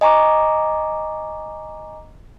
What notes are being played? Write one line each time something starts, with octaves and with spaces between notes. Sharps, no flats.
D#5 G#5 A#5 C#6 D6